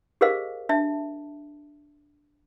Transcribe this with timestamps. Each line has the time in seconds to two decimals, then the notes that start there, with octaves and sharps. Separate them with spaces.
0.21 G4 G#4 A#4 C5 D#5 F5
0.69 D4 E5 A5